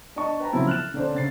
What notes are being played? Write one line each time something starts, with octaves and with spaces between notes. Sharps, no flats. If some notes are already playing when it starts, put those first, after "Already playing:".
D4 D#5 A5 C#6
B4 G5 A5 A#5
C#3 F3 F#3 C4 E4
F6 F#6 A6 E7
D3 C#4 D4 C5
C#3 A6 C7